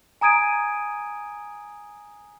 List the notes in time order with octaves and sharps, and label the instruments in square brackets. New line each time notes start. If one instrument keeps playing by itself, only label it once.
[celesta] G#5 A#5 D#6 G#6 D7 D#7